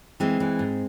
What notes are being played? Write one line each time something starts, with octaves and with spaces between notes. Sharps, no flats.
E3 G#3 C4
E3
G#2